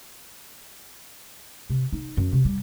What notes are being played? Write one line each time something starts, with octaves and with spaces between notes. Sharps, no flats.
C3
D#4
F#2
C3
G3